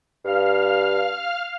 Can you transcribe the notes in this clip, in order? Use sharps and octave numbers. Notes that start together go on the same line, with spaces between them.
G2 F5 F6